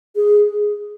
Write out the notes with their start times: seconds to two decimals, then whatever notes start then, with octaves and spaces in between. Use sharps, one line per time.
0.16 G#4